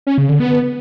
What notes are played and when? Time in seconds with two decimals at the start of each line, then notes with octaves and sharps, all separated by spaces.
0.07 C#4
0.18 C#3
0.29 D3
0.40 B3